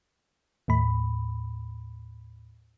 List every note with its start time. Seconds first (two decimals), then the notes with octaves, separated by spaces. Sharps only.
0.68 D#2 A2 B5